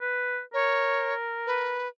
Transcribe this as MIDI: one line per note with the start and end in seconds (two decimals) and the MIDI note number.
0.01 0.40 71
0.54 1.84 70
0.54 1.14 73
1.46 1.88 71